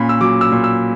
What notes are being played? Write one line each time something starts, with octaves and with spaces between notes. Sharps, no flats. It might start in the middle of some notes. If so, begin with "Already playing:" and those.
Already playing: A#2 C#4 B5
E6
F#3 D6
E6
A#2
E6